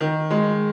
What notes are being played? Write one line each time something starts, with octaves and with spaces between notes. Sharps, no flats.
D#3
G#3